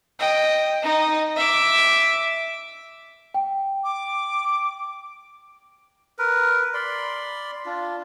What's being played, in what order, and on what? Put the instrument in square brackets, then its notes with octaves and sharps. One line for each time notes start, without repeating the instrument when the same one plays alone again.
[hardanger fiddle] D#5 G5
D#4 D#5
E5 D6
[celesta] G5
[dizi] D6
[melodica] A#4 B4
D5 B5 C6
D4 F4